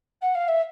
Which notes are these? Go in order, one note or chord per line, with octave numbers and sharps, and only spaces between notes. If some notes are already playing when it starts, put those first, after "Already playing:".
F#5
F5
E5